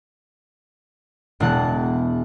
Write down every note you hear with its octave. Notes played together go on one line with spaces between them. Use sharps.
E1 B2 E3 G#3 F#5 A5